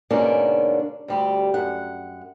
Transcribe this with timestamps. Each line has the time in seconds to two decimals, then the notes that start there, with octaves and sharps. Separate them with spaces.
0.10 G#2 B2 D3 A#3 C#4 D4
1.08 D2 G3 G4
1.54 F#2 F#5